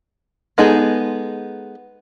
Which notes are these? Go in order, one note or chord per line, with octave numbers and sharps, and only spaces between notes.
G#3 B3 D#4 G#4 A4